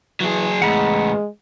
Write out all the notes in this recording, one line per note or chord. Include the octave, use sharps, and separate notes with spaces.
E3 F#3 G#4
E2 A2 G#3 F#5 A#5 B5